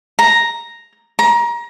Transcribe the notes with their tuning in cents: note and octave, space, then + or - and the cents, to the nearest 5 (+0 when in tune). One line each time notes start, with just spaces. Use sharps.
A#5 +0
A#5 +25